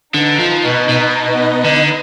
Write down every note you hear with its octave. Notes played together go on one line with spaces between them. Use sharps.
D3 D#4 B4 D#5
F3
B2
B2
D3